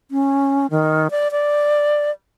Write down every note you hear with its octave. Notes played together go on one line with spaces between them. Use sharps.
C#4
D#3
D5
D5